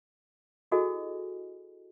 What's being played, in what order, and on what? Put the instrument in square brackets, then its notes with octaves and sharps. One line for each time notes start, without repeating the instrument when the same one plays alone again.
[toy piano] E4 F#4 G#4 A4 D#5 G#5